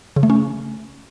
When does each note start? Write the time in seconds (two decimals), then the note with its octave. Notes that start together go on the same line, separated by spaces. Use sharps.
0.16 C#3
0.23 A3
0.30 C#4